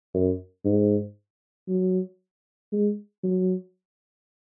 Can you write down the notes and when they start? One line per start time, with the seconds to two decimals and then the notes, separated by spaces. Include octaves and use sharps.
0.14 F#2
0.65 G#2
1.69 F#3
2.73 G#3
3.23 F#3